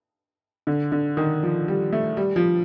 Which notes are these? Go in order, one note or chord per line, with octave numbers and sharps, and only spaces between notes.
D3
D3
D#3
F3
G3
A3
G3
F3